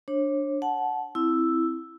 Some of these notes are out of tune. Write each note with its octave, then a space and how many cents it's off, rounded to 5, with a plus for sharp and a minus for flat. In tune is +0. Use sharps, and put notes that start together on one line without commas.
D4 +0 C#5 -35
F#5 +0 A5 -20
C4 +0 E4 +0 E6 +0